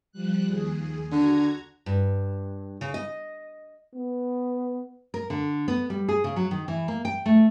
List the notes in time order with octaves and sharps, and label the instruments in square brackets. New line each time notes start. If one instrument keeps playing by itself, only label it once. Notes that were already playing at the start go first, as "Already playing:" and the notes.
[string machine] F3 G3 F#6
D#2 G#4
[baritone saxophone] D3 [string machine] F#4 A#5 G#6
[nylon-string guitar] G2
C#3
D#5
[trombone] B3
[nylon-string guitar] A#4
D3
B3
G3
G#4
C#3
F#3
D#3
E3
A#3
G5
A3